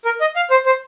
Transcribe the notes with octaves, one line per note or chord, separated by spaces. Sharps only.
A#4
D#5
F5
C5
C5